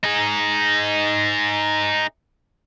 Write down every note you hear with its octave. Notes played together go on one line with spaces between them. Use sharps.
D#4 G#4